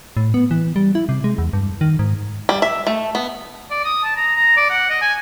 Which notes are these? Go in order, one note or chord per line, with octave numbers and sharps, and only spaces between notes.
A2
B3
E3
G3
E4
C3
G#3
E2
G2
D#3
G#2
G3
E5
A3
B3
D5
D#6
A5
A#5
A#5
D5
F#5
D#5
G#5